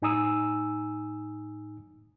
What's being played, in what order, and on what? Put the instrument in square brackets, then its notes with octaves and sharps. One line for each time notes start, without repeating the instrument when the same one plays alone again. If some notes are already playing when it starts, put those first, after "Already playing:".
[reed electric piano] A2 D#4 G#5 A#5 D#6 E6